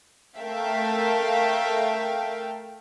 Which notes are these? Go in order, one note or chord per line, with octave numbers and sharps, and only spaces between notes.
A3 A#4 E5 F5 G5